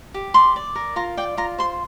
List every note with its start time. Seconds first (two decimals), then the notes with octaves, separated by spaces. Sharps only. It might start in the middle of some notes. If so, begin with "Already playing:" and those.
0.14 G4
0.34 D5 C6
0.56 D5
0.76 A#4
0.96 F4 A#5
1.17 D5 G5
1.37 F4 A#5
1.59 C5 C6